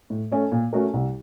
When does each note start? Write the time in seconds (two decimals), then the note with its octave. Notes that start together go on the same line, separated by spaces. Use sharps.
0.10 A2
0.31 A3 C#4 A4
0.52 A#2
0.73 A3 C#4 F#4 A#4
0.94 C2